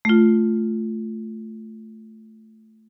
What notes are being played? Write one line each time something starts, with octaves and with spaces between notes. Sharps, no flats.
A3 F4